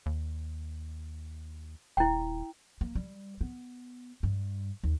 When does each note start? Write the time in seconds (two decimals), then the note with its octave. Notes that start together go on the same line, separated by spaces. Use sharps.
0.06 D#2
1.97 D#1 E4 G5
2.81 A#3
2.95 G3
3.41 B3
4.23 G2
4.83 D#2